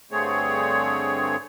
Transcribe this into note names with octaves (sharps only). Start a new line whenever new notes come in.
G2 D3 A3 C4 G#4 C#5